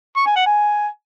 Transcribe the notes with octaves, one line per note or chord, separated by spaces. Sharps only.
C#6
G#5
F#5
G#5